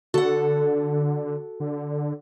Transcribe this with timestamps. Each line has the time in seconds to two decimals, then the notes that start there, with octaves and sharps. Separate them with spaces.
0.14 D3 F#4 A4 F#5
1.60 D3